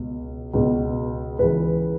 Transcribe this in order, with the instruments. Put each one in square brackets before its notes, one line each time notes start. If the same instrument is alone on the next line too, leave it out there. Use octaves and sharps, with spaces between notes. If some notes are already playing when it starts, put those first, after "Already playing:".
Already playing: [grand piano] C#2 B2
C#2 B2
C#2 C#3 E3 B4